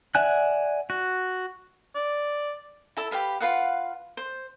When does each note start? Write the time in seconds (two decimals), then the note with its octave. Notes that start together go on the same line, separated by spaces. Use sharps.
0.15 D5 E5 F#5 G#5 F#6
0.90 F#4
1.95 D5
2.97 E4 A4 A5
3.11 G4 B4 F5 B5
3.40 F4 B4 F5 F#5
4.17 C5